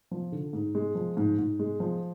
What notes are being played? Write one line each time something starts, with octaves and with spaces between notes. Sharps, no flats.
F3
D3
G#2
G#3
F3
G#2
G#2
G#3
F3